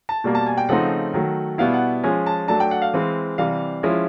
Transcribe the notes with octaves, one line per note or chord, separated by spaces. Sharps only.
A5
B2 G3 A#3
A5
G#5
G5
C#3 F3 A3 C4 D#4 F#5
D#3 F#3 A3
B2 G3 B3 E4 F5
F#5
F3 G#3 C#4 G#5
A5
F#3 A3 D4 A5
G5
F#5
F5
E3 G#3 C4
C3 E3 G3 F5
F3 G#3 C#4 E4